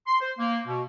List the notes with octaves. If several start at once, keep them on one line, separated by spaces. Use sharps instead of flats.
C6
C5
A#3
B2